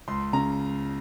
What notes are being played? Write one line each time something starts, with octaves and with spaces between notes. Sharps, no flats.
C#2 C6
C#3 A#5